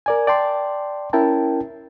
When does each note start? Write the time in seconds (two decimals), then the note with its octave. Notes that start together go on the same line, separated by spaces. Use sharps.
0.06 A#4 D5 G#5
0.27 D5 G5 A5 C6
1.13 C#4 E4 A#4 G5 A5